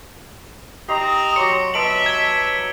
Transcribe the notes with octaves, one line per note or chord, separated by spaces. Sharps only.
C4 D#4 G4 A#5 C6 D#6
F#3 C#5 C6 D6 C#7
B3 D#5 E5 A5 C6 D7 F#7
G#6 G7